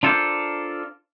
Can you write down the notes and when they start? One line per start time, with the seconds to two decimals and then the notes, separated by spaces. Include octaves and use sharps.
0.03 D4 F4 A4 A#4 C5 D5